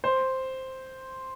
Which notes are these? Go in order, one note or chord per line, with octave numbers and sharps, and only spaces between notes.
C5